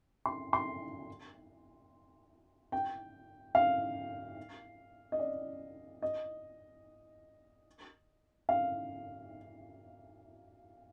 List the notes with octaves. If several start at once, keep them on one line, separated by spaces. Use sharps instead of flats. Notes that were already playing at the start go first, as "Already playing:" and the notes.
C6
C6
G5
F5
D#5
D5
D#5
F5